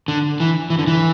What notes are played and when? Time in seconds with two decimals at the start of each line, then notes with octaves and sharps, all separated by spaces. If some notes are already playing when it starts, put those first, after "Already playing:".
0.08 D3
0.40 E3
0.70 E3
0.79 D3
0.87 E3